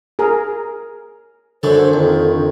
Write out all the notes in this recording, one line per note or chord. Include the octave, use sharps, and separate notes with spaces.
G#4 A#4
F#2 D3 F#3 A4 C5
F2 D#3